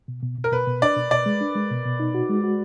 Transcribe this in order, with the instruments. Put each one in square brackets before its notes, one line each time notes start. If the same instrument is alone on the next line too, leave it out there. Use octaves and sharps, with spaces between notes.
[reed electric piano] B2
B2
B2
[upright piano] A#4
[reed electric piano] B2 [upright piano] B4
[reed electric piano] B2
[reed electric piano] D4 [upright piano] D5
[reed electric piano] B2
[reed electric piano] B2 [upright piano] D5
[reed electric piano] G#3
D4
G#3
B2
B2
D#4
F#4
G#3
F#4